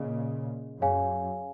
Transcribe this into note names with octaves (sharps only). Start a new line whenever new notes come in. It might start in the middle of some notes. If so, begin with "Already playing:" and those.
Already playing: A#2 C#3 G#4 D#5
F#2 G#4 C#5 F5 G#5